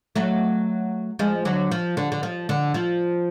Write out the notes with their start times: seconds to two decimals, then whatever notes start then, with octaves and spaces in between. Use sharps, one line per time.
0.16 F#3 A3
1.19 F3 G#3
1.45 D3 F#3
1.72 F3
1.97 D3
2.12 D3
2.23 F3
2.49 D3
2.74 F3